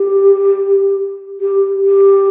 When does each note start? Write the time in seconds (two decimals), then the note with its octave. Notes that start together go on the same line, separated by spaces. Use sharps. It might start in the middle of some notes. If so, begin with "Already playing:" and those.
Already playing: G4
1.41 G4
1.83 G4